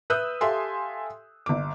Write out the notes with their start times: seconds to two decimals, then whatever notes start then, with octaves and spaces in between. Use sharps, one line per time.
0.10 B4 E5 D#6 E6 F#6 G6
0.41 G4 A4 E5 F5 G#5 C6
1.46 G1 D6